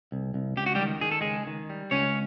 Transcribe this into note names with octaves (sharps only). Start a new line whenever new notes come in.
C2
C2
C#2 G4
F#4
G3 G4
D#3
D#3 G#4
A4
C#2 G#3 G#4
D#3
G3
C#2 C#4 C#5